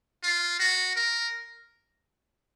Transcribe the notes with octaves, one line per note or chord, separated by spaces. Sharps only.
F4
F#4
A#4